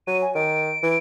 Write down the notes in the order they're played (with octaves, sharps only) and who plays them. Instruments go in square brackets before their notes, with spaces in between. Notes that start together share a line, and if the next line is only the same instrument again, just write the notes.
[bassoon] F#3 [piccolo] D#7
[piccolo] G#5
[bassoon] D#3 [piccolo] D7
[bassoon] E3